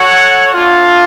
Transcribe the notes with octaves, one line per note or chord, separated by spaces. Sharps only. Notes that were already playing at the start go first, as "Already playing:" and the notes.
Already playing: F#4 A4 C#5 F#5
A3 D4 F4